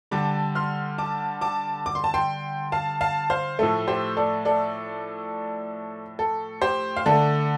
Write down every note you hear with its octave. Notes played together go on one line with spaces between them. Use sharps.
D3 G3 A5 D6
C6 F6
A5 D6
A5 D6
D6
C6
A5
G5 C6
F5 A5
F5 A5
C5 F5
A2 F3 A3 A4
G4 C5
A4 D5
A4 D5
A4
G4 C5
F5
D3 A3 A4 D5